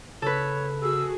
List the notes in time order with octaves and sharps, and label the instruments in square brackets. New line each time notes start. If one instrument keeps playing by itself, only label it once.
[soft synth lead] C#3 [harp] A4 B4 [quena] C#5
[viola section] F#4 G#4 [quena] E6